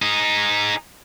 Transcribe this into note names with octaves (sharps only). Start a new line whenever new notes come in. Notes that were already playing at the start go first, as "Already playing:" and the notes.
D#4 G#4